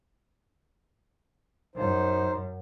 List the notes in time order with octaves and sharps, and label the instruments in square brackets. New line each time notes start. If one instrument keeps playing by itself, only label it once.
[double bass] F#2 [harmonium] D#4 C5